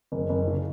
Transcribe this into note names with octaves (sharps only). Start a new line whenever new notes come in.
F#1
F#1
C#3